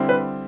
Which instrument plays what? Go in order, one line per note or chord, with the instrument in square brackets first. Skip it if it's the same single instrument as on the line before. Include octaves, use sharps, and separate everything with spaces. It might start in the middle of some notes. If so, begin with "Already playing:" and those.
Already playing: [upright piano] D3 G3 C4 E4
B4